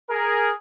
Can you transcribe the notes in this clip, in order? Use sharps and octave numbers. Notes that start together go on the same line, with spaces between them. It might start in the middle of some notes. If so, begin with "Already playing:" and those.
G#4 A#4